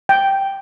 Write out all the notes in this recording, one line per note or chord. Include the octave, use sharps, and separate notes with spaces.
G5